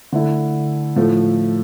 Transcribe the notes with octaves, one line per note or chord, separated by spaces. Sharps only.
D3 A3 E4
A2 F3 A3